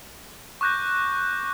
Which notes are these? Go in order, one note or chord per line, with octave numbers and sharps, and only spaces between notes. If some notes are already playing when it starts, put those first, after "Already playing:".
C#6 D6 F#6 G6 A#6